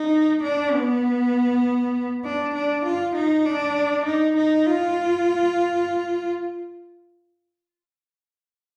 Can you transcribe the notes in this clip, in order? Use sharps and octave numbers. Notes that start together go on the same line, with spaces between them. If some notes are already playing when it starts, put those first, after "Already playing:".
Already playing: D#4
D4
B3
D4
D4
F4
D#4
D4
D#4
D#4
F4